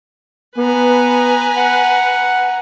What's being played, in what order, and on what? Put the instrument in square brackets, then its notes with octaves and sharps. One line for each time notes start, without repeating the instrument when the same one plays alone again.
[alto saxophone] B3 [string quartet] B4 G#5 A#5
[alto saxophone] F#5